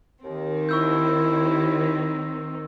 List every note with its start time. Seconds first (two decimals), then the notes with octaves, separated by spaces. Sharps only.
0.24 D#2 D#3 C4
0.69 E4 C#6 E6 G6